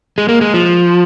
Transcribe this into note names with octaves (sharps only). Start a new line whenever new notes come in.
G#3
A#3
G#3
F3